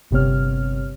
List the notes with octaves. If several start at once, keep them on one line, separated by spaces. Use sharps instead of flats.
G1 C3 B3 C#5 F6